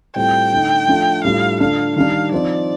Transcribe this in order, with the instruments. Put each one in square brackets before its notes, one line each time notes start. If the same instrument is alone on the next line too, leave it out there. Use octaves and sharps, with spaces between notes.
[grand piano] A2 G3 C4 F4 [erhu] G5
[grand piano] D3 A3 D#4
F3 A3 D4 F4
[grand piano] A2 G3 D4 F4 [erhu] F5
[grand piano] D3 A3 D4 F4 [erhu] F5
[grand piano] D#3 G3 D4 [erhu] F5
[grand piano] F3 C4 D#4 [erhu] D5